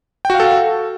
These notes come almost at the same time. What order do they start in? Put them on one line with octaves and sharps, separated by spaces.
G5 F#4 F5 A4